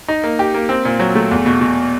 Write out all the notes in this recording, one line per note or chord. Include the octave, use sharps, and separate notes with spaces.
D#4
A#3
G4
A#3
C4
A#2
F#3
A3
E2
B2
B2